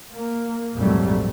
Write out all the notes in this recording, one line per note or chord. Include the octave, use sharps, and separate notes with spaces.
A#3
A#1 F2 G#2 F#3 G3 A3